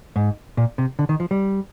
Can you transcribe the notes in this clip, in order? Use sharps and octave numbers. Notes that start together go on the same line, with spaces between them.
G#2
A#2
C3
D3
D#3
F3
G3